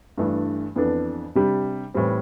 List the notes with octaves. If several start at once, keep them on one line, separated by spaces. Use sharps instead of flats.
G2 E3 A3 D4
F2 E3 B3 D4 A4
C3 G3 D4 G4
A2 E3 G3 C4